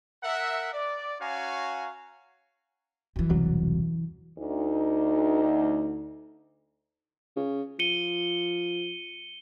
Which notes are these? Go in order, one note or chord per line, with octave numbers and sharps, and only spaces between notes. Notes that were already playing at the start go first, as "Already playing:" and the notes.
A#4 E5 F#5
D5
C#4 F#4 C#5 F5 G#5 A#5
F#2 E3
E1 C2 F#3
D2 D#4
C#3
F3 C#7 D#7 G7